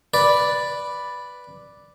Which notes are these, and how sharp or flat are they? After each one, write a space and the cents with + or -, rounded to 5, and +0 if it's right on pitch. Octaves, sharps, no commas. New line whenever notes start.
B4 +0 D5 +0